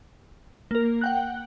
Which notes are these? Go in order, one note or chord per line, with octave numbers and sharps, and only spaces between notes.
A#3 A#4
F#5 G5 F#6